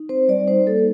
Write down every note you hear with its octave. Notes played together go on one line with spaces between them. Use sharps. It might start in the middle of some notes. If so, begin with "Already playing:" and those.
Already playing: D#4
C4 C5
G3 D5
D#4 C5
A#3 A4